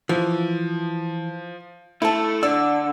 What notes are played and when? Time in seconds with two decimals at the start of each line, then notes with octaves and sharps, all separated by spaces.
0.09 E3 F3
2.02 A3 E4 A5
2.43 D3 D5 E6